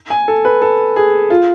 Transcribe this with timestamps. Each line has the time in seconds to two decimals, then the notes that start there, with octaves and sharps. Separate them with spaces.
0.10 G#5
0.28 A4
0.45 B4
0.62 A4
0.96 G#4
1.30 F4